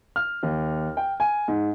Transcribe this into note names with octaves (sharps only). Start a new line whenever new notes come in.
F6
D#2
G5
G#5
G#2